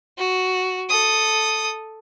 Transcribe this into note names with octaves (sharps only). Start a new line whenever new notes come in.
F#4
A4 D#6